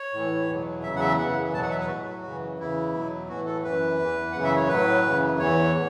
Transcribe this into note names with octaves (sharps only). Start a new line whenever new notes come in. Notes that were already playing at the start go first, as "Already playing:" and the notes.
Already playing: C#5
A2 E3
E2 B2 F#3
E2 C#3 F#3 E5
F#5
E5
F#2 C#3 E3 F#5
E2 B2 F#3 A5
F#5
E5
B4
A2 F#3 F#4
F#2 C#3 E3
E2 C#3 E3 E4
E2 B2 F#3
A2 E3 F#4
A4
F#2 E3 B4
E2 E3
F#2 C#3 E3 F#5
E5
C#5
A2 F#3 B4
F#2 C#3 E3
E2 E3 C#5
A2